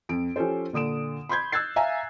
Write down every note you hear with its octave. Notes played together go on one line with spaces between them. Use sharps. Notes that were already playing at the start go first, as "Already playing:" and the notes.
F2 D7
F3 C#4 G4 A4 C5
A#2 D3 D#6 D7 E7
B5 C6 G6 G#6
E6 F#6 G#6 A6 C7
E5 F5 G#5 A#5